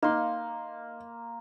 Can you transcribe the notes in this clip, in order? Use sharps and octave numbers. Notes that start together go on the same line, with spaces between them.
A#3 D#4 C6